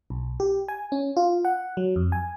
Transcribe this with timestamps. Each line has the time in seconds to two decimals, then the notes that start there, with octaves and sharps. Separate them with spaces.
0.10 B1
0.40 G4
0.68 G#5
0.92 C#4
1.17 F4
1.45 F#5
1.77 F#3
1.96 F2
2.12 G#5